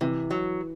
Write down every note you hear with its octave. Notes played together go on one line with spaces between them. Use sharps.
C3 E3
F#3